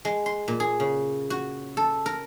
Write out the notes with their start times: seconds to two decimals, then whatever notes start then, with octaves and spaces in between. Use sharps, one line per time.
0.05 G#3
0.26 C6
0.48 A#2
0.60 G#4
0.80 C#3
1.30 F#4
1.77 A4
2.06 A#4